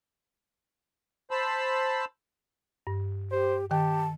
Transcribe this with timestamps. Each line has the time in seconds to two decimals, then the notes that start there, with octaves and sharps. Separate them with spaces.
1.31 C5 A5 B5 E6
2.87 G2
3.31 G4 C5
3.71 D#3 G4 G5 A5